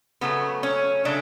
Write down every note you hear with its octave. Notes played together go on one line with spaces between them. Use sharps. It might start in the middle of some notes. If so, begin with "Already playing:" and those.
C#3 F#3 A3 B3
C#4
C#3 F#3 A3 D4